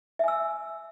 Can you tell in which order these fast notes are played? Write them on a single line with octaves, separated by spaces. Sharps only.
E5 G#5 E6